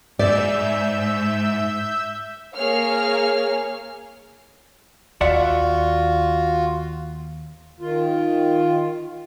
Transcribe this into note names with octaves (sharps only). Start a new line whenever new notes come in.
G#2 D5 E5 E6 G6
A#3 G#4 C#5 F5 F6
D#2 F4 F#4 D5 E5 F#5
D#3 F4